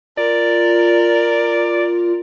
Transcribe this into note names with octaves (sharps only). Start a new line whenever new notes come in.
F4 A#4 D5